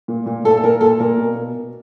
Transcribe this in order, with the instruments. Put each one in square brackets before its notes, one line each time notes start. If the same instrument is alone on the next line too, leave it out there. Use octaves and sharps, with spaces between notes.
[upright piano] A#2
A#2
A#2 A4
A4
A#2 A#4
A#2 A4
A#2 A#4
B2
B2
B2